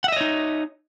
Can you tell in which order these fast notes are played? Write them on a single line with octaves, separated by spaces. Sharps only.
F#5 E5 D#5 C#5 D#4